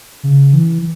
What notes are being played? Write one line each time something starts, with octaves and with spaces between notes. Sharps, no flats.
C#3
E3